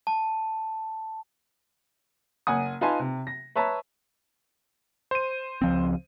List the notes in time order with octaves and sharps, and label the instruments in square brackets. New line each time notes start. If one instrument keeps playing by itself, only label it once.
[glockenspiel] A5
[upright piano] F#1 F#5 G#5 D#6
D#4 F4 B4 G#5 A5 C6
C3
A#6
B4 C#5 E5 A5 A#5
[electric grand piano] C5 D#7
[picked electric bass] C#2 F3 C4